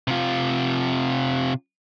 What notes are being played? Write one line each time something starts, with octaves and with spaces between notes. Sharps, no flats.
C3 F4